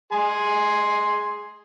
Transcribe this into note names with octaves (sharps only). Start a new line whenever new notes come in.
G#4 G#5 C6